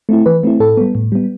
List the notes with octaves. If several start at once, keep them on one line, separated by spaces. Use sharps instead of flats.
A3 C4 E4
E3 B4
A3 C4 E4
A2 A4
G3 B3
A2
G3 B3